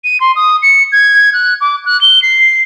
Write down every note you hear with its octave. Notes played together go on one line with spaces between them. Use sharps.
D#7
C6
D#6
C#7
G#6
F#6
D6
F#6
G7
C7